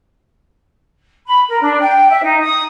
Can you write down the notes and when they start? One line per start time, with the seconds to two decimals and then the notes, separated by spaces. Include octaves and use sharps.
1.27 B5
1.49 A#4
1.61 D4
1.80 G5
2.09 E5
2.23 D#4
2.41 D#6